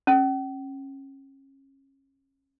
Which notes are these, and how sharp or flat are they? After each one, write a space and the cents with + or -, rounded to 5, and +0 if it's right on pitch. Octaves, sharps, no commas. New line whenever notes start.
C#4 -30